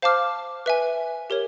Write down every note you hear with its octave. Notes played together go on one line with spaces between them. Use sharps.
C5 F5 A5 D6 F6
B4 E5 G#5
G4 A#4 C#5